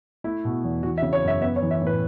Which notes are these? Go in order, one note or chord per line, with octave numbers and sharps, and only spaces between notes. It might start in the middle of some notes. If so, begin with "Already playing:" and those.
A3 E4
B2
E2
E3 F#4
E5
C#3
C#5
F#2 E5
B3 E5
C#5
E3
E5
A2 B4